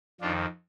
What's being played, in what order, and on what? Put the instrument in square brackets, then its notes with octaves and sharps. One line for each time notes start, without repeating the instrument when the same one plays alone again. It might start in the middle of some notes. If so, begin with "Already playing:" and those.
[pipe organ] F2 D#3 D4 F4